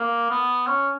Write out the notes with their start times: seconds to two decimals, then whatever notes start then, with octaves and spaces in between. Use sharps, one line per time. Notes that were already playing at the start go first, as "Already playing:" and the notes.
Already playing: A#3
0.30 B3
0.67 C#4